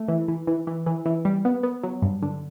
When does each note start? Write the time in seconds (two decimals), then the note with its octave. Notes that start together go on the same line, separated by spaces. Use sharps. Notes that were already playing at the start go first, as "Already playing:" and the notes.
Already playing: A3
0.08 E3
0.28 E3
0.47 E3
0.67 E3
0.86 E3
1.06 E3
1.25 G3
1.45 B3
1.63 B3
1.83 F#3
2.02 G2
2.22 D3